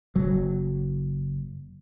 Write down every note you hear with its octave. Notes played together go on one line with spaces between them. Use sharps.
F#1 F#3